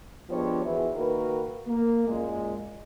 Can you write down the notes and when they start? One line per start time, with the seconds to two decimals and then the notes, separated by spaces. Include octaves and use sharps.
0.30 F3 G#3 B3 D4 G4 C#5
0.63 E2 E3 F#3
0.95 D#3 A#3 F#4 A#4 B4
1.67 A#3
2.08 F#2 A#2 G#3